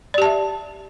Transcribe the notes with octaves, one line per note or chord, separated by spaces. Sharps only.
G4 D5 E5 A5